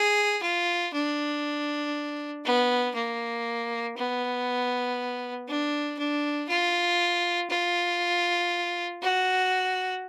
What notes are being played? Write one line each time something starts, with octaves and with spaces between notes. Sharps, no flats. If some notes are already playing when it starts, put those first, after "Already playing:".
Already playing: G#4
F4
D4
B3
A#3
B3
D4
D4
F4
F4
F#4